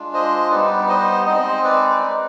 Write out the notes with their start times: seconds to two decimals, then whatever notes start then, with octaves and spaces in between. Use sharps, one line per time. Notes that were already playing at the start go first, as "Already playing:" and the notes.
Already playing: G#3 D4 F4
0.14 C5 D#5
0.51 G3 B3 D#4 B4 D5
0.89 C5 D#5
1.26 G#3 C4 D#4 C5 D#5
1.64 B4 D5
2.02 G#3 C4 D#4 B4 D5